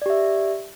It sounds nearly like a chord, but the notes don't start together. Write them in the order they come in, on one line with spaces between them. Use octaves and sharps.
D5 G4 E5